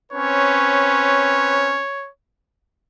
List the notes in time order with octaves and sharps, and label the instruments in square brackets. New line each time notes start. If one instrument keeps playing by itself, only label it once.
[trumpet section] C4 C#4 B4 [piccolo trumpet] C#5